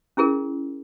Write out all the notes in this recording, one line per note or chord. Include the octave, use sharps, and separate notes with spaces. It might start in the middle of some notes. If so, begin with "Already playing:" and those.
C#4 E4 G#4 A#4